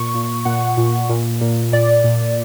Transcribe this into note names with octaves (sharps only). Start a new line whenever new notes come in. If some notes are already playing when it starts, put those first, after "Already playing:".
Already playing: A#2 C#6
A#2
A#2 F#5
A#2
A#2
A#2
A#2 D5
A#2